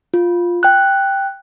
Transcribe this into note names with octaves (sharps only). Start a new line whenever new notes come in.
F4
G5 F#6